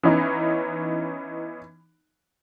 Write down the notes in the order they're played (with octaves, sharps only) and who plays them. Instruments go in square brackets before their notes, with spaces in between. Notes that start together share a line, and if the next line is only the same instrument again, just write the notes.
[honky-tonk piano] E3 B3 C#4 D#4